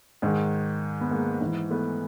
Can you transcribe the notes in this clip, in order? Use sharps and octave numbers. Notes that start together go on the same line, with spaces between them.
G#2 D#3 G#3
B3
G#3 A#3
G#2 E3
A3 B3